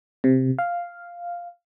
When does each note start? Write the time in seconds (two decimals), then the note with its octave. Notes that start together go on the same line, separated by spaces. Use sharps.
0.24 C3
0.59 F5